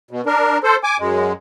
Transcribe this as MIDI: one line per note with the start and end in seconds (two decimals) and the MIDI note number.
0.11 0.21 47
0.26 0.58 62
0.26 0.58 70
0.64 0.76 69
0.64 0.76 72
0.84 0.97 80
0.84 0.97 86
0.99 1.33 42
0.99 1.33 56